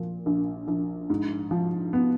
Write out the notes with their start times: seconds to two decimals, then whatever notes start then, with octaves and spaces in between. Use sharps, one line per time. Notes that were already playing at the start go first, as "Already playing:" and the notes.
Already playing: A#2 F3
0.26 A#1
0.68 A#1
1.10 G#2
1.51 F3
1.93 B3